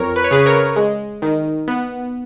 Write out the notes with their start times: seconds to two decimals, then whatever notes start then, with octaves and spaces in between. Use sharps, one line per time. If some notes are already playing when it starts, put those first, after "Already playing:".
Already playing: F2 A#4 C#5
0.16 B4
0.24 C#5
0.31 C#3 G#4 B4
0.46 A#4 C#5
0.76 G#3
1.22 D#3
1.68 B3